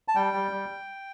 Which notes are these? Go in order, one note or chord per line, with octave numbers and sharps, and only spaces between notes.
A5
G3 G5
G3
G3